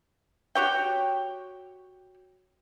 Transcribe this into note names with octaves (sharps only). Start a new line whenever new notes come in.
F#4 G4 C#5 G5